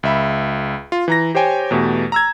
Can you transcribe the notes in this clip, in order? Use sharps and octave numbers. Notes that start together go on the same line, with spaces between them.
C#2 E5 B5
F4
E3 A#5 A#6
G4 C5 C#5 G5 G#5
E2 B2 A3 G4
A#5 E6 G#6